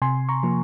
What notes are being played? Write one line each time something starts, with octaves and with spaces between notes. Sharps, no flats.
C3 G#5 C6
A#5 C#6
F3 A#3